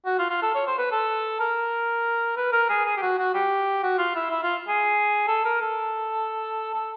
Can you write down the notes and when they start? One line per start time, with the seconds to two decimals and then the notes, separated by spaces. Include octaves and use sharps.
0.05 F#4
0.18 F4
0.30 F4
0.42 A4
0.55 C#5
0.67 C5
0.78 B4
0.91 A4
1.40 A#4
2.37 B4
2.52 A#4
2.69 G#4
2.85 G#4
2.97 G4
3.02 F#4
3.18 F#4
3.34 G4
3.83 F#4
3.98 F4
4.15 E4
4.30 E4
4.43 F4
4.68 G#4
5.28 A4
5.45 A#4
5.61 A4
6.74 A4